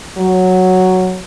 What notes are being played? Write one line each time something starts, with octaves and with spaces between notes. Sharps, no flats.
F#3